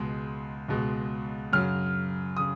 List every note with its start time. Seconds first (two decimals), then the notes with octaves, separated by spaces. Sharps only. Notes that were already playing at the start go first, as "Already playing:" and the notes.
Already playing: C#2 B2 G#3
0.69 C#2 B2 G#3
1.53 F#2 C#3 F#3 F6
2.37 C#3 D#6